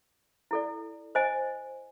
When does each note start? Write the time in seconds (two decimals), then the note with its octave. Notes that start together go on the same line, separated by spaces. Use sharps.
0.51 E4 A4 D5
1.15 C5 D#5 G#5